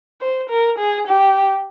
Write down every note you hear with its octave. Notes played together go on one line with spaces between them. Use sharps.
C5
A#4
G#4
G4